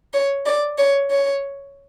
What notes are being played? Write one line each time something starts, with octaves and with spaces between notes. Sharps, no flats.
C#5
D5
C#5
C#5